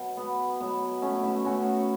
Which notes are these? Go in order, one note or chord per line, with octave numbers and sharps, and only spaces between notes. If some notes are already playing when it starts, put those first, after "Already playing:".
Already playing: B2 F#3
B3
B2 F#3 B3
A3 C#4
B3 E4
A2 F#3 C#4 F#4